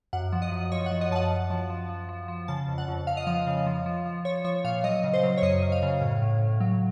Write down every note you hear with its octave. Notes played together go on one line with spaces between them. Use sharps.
F#2 F#5
F3
D#5
F#2
F3 C#5
F#5
F3
D#5
F#2 F#5 A5
F#2
F3
F3
F3
F3
F3
C#3 A5
F2
F#5
F2
F2 F5
D#5
F3 F5
C#3
F3
F3
F3
F3 C#5
F3 C#5
A#2 F5
F#3 D#5
C#3
C5
F#3
C#5
F#2 D#5
F#2
F5
C#3
A2
A2
A2
F#3